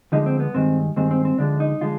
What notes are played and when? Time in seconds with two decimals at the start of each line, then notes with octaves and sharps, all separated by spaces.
0.12 D2 D3 F3 G#3 D#4
0.26 C4
0.40 B3
0.54 G2 D#3 G#3 C4
0.96 G2 D#3 G#3 C4
1.11 C4
1.25 C4
1.38 D2 D3 F3 G#3 D4
1.60 D#4
1.81 D3 F3 G#3 F4